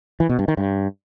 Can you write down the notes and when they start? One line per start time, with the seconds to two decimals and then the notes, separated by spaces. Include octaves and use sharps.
0.20 E3
0.29 B2
0.39 G2
0.48 D#3
0.57 G2